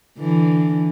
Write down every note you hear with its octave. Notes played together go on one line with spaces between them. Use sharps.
D3 E3